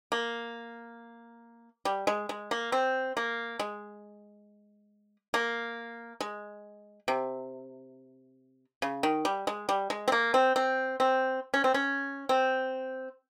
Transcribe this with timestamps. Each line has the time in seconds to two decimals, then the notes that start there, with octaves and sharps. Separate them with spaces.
0.12 A#3
1.85 G3
2.07 G#3
2.29 G#3
2.51 A#3
2.72 C4
3.17 A#3
3.59 G#3
5.34 A#3
6.21 G#3
7.08 C3
8.82 C#3
9.03 D#3
9.25 G3
9.47 G#3
9.69 G3
9.90 G#3
10.08 C4
10.12 A#3
10.34 C4
10.56 C4
11.00 C4
11.54 C#4
11.64 C4
11.74 C#4
12.29 C4